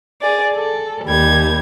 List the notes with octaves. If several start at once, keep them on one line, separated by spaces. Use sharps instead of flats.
G#4 D5
A4
D#2 G3 G#6